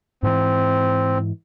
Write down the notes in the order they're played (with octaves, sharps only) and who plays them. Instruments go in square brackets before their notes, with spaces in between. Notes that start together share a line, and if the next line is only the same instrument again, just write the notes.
[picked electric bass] G#2 E3 [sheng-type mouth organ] C4